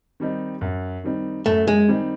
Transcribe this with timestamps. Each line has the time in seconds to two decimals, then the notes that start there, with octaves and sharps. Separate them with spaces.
0.20 D#3 G3 C4 D#4
0.61 F#2
1.04 D#3 G3 C4 D#4
1.46 F#2 A3
1.67 G#3
1.88 D#3 G3 C4 D#4